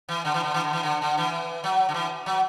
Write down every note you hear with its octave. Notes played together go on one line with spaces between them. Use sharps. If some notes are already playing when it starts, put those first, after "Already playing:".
E3
D3
E3
D3
E3
D3
E3
D3
D3
E3
F#3
D3
E3
F#3